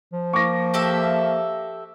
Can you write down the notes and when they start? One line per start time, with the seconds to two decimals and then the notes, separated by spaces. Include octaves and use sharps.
0.13 F3
0.33 A#3 C#6 D6 A#6
0.74 G4 A4 E5